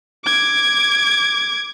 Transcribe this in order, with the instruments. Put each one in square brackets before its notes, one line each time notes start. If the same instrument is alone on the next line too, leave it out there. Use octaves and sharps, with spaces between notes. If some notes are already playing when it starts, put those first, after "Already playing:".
[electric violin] D6 G#6